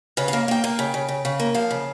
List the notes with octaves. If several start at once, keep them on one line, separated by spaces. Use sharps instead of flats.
C#3 B4
F5
A#3
A#3 G5
A#3
C#3
C#3
C#3
C#3
A#3
F3 F5
C#3